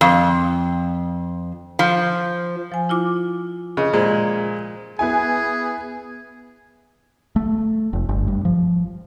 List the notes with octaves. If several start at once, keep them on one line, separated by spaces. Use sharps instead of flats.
F2
F3
F3 G#5
E4 F4 D6
C#3 D#5
A#2 G#3 C5
B3 E4 G#4 G#5
A3
F1
G1
G2
F3